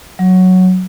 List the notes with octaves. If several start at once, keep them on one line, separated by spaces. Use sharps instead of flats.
F#3